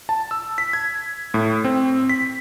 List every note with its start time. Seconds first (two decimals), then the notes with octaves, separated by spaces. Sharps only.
0.09 A5
0.31 E6
0.58 B6
0.73 G#6
1.34 A2
1.64 C4
2.09 B6